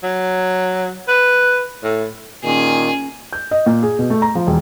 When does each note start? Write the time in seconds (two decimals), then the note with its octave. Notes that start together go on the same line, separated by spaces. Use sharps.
0.03 F#3
1.08 B4
1.84 A2
2.44 A#2 D#3 C#4 G#4
3.33 G6
3.51 D#5
3.66 A#2
3.83 G#4
3.99 B2
4.10 A3
4.22 A#5
4.35 F3
4.47 E1